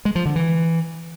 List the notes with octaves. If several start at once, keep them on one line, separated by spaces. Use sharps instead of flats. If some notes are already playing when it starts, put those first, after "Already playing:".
G#3
F3
D3
E3